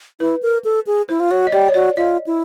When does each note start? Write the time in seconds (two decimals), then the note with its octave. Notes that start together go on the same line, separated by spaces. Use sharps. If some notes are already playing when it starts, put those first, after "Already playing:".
0.20 E4 B4
0.42 A#4
0.64 A4
0.87 G#4
1.09 E4 C5
1.20 F4
1.31 F#4 C#5
1.47 D#5
1.52 G4 D5
1.68 C#5
1.74 F#4 D5
1.97 F4 D#5
2.26 E4